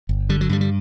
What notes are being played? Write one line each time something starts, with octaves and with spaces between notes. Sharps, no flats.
G1
D3 G3
F#3
G2 G3
G3